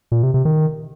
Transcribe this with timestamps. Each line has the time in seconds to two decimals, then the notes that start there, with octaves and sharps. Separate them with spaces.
0.12 A#2
0.23 C3
0.34 C3
0.45 D#3